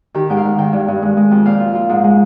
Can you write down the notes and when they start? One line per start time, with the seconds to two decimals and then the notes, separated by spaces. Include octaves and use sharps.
0.14 D#3 G4
0.30 G#2 G5
0.37 F5
0.45 G#2
0.58 D#3 G5
0.73 G2
0.88 G2
1.02 G#3
1.17 G#3
1.31 F2
1.46 A#2 F5
1.60 F4
1.75 F4
1.89 G#2
2.04 G#3